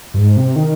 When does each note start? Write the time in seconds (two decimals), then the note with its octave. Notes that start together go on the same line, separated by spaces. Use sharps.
0.14 G2
0.19 G#2
0.37 C3
0.56 D#3